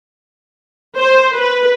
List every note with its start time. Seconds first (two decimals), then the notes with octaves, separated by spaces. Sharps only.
0.98 C5
1.34 B4